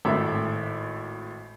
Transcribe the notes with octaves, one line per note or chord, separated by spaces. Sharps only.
G#1 A2 E5